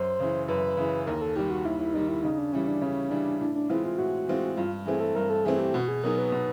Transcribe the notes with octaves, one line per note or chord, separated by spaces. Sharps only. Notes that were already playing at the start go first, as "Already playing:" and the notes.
Already playing: F#2 C5
C#3 E3
F#2 B4
C#3 E3
D#2 A#4
A4
D#3 G3 G4
F#4
D#2 E4
E4
D#3 G3 D#4
E4
C#3 D#4
D4
E3 G3 C#4
D4
C#3 C#4
E3 G3 D4
A2 D4
D4
E3 G#3 C4 E4 F4
F4
A2 F#4
E3 G#3 C4 F4
G2 F4
E3 A3 C4 G#4
A4
G2 A#4
A4
E3 A3 C4 G#4
G4
B2 F#4
G#4
F#3 B3 D#4 G#4 A#4
B4
B2